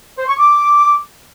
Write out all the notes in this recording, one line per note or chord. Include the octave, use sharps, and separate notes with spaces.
C5
C#6
D6